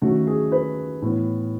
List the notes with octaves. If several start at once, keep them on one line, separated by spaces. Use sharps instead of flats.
D#2 D#3 F#3 A3 C#4 F#4
G#4
B4
A2 E3 B3